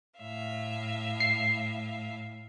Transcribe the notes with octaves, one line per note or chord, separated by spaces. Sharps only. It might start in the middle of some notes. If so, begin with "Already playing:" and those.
A2 E5 F5
C7